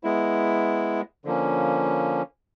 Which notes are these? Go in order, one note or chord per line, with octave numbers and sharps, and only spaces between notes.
G#3 B3 E4
D3 F3 A#3 C#4